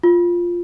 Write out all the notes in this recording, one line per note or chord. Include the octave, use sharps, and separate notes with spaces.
F4